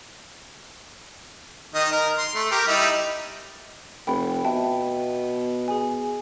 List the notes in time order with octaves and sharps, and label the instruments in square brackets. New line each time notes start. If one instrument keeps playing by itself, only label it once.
[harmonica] D#3 D#5
A#4
C6
A3
G4 A#4
G3 D#4 E4
[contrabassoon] F1 [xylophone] G5 B5
[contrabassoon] B2 [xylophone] E5 G5 A5
[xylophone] G#4 G#5